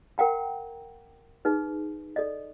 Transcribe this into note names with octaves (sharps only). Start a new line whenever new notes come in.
A#4 F#5 G5 A#5
D#4 G#4 B4
A4 D5 D#5